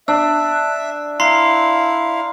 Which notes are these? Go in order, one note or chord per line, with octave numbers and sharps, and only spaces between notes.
D4 E5 E6
E4 F5 A#5 C6 C7